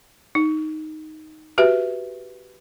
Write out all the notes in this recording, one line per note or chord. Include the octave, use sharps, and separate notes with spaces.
D#4
F#4 G4 B4 E5